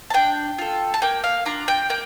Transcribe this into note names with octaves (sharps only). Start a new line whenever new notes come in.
A5
D4 G5
F4 A4
A5
A#3 G5
F5
D4 F4 A#5
G5
A#3 G5